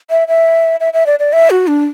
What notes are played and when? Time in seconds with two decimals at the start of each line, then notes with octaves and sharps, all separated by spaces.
0.10 E5
0.28 E5
0.80 E5
0.93 E5
1.06 D5
1.19 D5
1.33 E5
1.50 F#4
1.67 D4